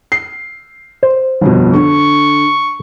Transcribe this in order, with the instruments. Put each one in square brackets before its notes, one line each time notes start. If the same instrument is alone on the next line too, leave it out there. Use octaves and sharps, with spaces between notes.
[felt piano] C7
[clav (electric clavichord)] C5
[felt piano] G1 F2 B2
[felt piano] D3 [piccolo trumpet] C#6